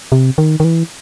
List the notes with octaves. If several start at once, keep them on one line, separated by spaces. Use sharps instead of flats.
C3
D#3
D#3
E3